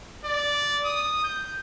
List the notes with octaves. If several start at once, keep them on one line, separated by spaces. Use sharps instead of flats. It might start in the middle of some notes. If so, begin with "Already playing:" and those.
D5
D#6
G6